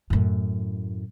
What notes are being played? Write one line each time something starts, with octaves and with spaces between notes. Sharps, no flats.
F#2 A2